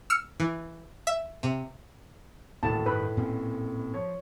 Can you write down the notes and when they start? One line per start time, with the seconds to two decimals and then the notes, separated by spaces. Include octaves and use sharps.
0.10 E6 F6 C#7
0.40 E3
1.07 E5
1.43 C3
2.63 D#1 D2 A2 A5
2.86 G2 D#3 B4 B5
3.17 A#2 C4 C#4
3.94 F3 C#5